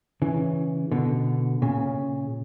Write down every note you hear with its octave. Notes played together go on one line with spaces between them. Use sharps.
C#3 E3
B2 D3
A#2 C#3